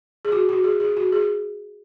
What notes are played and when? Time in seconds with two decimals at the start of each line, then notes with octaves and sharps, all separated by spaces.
0.25 G#4
0.32 F#4
0.49 F#4
0.64 G#4
0.80 G#4
0.97 F#4
1.12 G#4